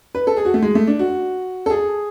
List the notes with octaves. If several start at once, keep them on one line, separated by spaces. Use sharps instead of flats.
B4
A4
G#4
F#4
A3
G#3
A3
D4
F#4
A4
G#4